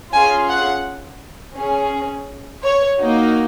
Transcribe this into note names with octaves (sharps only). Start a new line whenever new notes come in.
C#4 F4 G#4 G#5
F#5
C#4 G#4
C#5
A#3 D#4 F#4